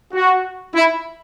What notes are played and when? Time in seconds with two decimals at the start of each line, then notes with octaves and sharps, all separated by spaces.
0.14 F#4
0.75 E4